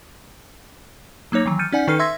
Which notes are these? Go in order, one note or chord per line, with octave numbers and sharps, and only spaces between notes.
F#3 A#3 D#4 C#5 A#6
D#3 E3 F#3
F6 G6 A6 C#7 D#7
C#4 D#4 D5 F#5 G#5
D#3 D#4 A4 B4 F6 C7
E5 C6 E6 G#6 A#6 B6